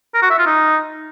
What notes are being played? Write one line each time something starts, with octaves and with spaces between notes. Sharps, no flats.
A#4
F#4
E5
F4
D#4